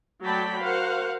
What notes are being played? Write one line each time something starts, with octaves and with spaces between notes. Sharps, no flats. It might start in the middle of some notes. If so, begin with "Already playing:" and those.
F#3 A3 D5 G5 A5 B5
F#4 A#4 C5 F5 F#5